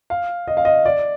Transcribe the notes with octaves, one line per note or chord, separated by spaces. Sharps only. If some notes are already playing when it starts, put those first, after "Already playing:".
F5
D#5
F5
D#5
D5